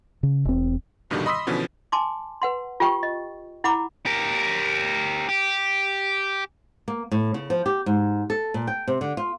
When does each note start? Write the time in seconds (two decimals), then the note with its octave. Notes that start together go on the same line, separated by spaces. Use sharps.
0.23 C#3
0.45 E1 C4
1.10 A#1 G2 B2 D3 D#3 G3
1.26 D#5 B5 C6 D#6 E6 B6
1.47 B2 D3 E3 F3 B3 C#4
1.92 G#5 A5 C6 D6
2.42 B4 F#5 C6
2.80 F4 G4 G5 C#6
3.03 D#5
3.64 E4 F#5 A#5 B5 D6
4.06 G4 A#4
5.29 G4
6.88 A#3
7.12 A2
7.34 C#3
7.50 F3
7.66 G4
7.86 G#2
8.30 A4
8.54 A#2
8.67 G5
8.88 C3
9.01 D3
9.17 F4